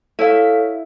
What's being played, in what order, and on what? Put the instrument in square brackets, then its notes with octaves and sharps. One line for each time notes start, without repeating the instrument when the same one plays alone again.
[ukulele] E4 [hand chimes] A4 C#5 F5